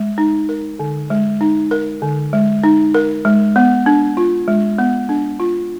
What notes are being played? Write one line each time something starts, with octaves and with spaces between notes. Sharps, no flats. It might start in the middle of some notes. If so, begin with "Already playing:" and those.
Already playing: G#3
D#4
A#4
D3
G#3
D#4
A#4
D3
G#3
D#4
A#4
G#3
B3
D4
F4
G#3
B3
D4
F4